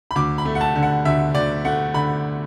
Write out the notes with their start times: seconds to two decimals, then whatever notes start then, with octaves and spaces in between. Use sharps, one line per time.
0.11 B5
0.15 D2 D6
0.38 B5
0.45 A3
0.55 F#5
0.61 A5
0.76 D3
0.83 F#5
1.05 D2 E5
1.35 D2 D5
1.65 A3 F#5
1.94 D3 B5